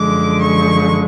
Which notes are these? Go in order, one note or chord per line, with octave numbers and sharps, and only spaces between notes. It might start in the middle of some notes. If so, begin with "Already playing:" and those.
Already playing: F#2 D3 F3 G#3 D6
C#6